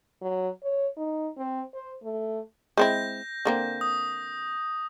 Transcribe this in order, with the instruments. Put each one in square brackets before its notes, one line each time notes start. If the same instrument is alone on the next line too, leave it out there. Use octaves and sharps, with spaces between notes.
[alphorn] F#3
C#5
D#4
C4
C5
A3
[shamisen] G#3 C4 E4 [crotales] G6 A#6
[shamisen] D3 A#3 C4
[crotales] D#6